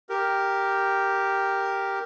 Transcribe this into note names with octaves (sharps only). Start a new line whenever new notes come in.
G4 A#4